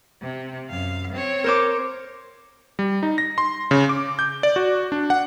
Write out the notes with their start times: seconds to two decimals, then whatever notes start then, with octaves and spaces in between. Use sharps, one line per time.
0.21 C3
0.70 F#2 F5
1.12 C4 C#5
1.44 A#4 C5 D6
2.79 G3
3.03 D#4
3.18 A#6
3.38 C6
3.71 C#3
3.89 D6
4.19 G6
4.43 D5
4.56 F#4
4.92 D4
5.10 F#5